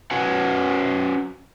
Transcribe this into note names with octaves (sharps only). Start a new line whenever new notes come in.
C#4 F#4 B4 C#5 F#5 G#5